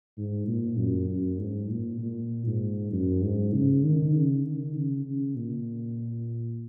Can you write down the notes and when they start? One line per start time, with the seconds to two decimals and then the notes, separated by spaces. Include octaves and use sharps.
0.18 G#2
0.48 A#2
0.78 F#2
1.09 F#2
1.39 G#2
1.70 A#2
2.01 A#2
2.46 G#2
2.92 F#2
3.23 G#2
3.53 C#3
3.84 D#3
4.14 C#3
4.45 D#3
4.76 C#3
5.06 C#3
5.36 A#2